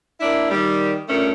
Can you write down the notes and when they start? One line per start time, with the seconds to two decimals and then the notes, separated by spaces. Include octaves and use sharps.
0.20 A#3 D4 E4
0.50 D#3 G3
1.09 G2 A#2 A3 C#4 A#4